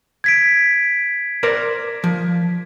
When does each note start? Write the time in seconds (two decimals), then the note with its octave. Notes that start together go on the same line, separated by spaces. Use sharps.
0.24 G#6 B6 D7
1.43 A#4 C5 D5
2.04 F3